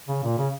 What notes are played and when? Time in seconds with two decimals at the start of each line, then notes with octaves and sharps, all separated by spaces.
0.08 C#3
0.23 A#2
0.38 C#3